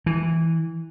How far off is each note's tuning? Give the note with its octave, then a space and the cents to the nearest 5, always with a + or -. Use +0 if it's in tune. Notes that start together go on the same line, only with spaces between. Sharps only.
E3 -10